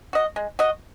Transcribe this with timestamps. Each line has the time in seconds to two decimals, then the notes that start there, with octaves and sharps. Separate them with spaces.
0.13 F#4 D#5
0.36 G#3
0.59 F#4 D#5